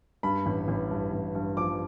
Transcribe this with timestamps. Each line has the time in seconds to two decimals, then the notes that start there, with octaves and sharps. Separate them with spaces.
0.23 G2 B5
0.46 A1
0.68 A1
0.91 G2
1.12 A1
1.35 G2
1.57 F3 D6